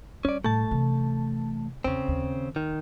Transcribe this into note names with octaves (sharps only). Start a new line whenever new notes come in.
G3 C#4 D5
A2 G3 A3 A5
C3 E3
E2 C#3 C4
D#2
D#3